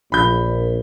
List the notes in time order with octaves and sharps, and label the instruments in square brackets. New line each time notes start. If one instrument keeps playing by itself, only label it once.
[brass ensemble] A#1 [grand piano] B5 G6